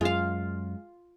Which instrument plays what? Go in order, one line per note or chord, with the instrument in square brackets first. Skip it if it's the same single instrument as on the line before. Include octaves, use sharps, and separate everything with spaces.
[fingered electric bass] F#2 [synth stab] G#3 [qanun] F4 F5